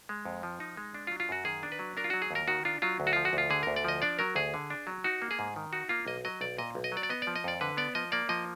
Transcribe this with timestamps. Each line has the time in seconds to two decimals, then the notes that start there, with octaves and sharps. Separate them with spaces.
0.09 G#3
0.25 F2
0.43 F3
0.60 D#4
0.77 G#3
0.94 D4
1.07 F4
1.11 F#3
1.20 F4
1.29 F#2 F#4
1.45 D#3 G#4
1.63 D4
1.72 B4
1.79 F#3
1.97 D4 A#4
2.04 F4
2.10 F#3 F#4
2.22 G#4
2.31 D#2 A#4
2.48 D#3 F#4
2.65 D4 F4
2.82 F#3 F4
3.00 D2
3.07 F#4
3.13 F3 F4
3.25 F#4
3.33 D2 F4
3.50 D3 G#4
3.63 D2 A#4
3.76 D5
3.84 F3 D#5
4.02 D4 D5
4.19 F#3 A#4
4.35 D2 G#4
4.54 D3
4.70 D4
4.87 F#3
5.04 D#4 F#4
5.22 A#3
5.31 G#4
5.39 G#2
5.56 D#3
5.73 D#4 F#4
5.89 A#3 F4
6.07 B1 D#5
6.25 F#3 D#5
6.41 B1 D5
6.58 A#2 D#5
6.75 B1
6.84 D#5
6.92 F#3 D5
7.03 D5
7.09 B3 D#5
7.22 D5
7.27 F3
7.36 D#5
7.44 F2 D5
7.61 D3 B4
7.77 B3 D5
7.95 F3 D#5
8.12 A#3 D5
8.29 F3 D#5